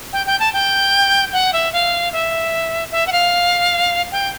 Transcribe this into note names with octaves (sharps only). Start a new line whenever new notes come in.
G5
G5
A5
G5
F#5
E5
F5
E5
E5
F#5
F5
G5